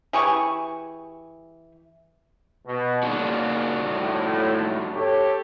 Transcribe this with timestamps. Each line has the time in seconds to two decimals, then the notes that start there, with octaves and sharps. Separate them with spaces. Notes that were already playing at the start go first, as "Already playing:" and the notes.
0.13 E3 G4 G#4 C#6
2.65 B2
3.03 A#2 C#3 A#3 D4 D#4 F#4
3.86 A2
4.94 G4 A4 C#5